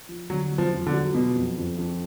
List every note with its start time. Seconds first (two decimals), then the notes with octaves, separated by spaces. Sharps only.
0.09 F3
0.30 D3 F#3
0.51 F#3
0.58 F3
0.73 F2
0.87 D3
0.93 F#3
1.15 B2 F#3
1.35 F2
1.58 F2
1.78 F2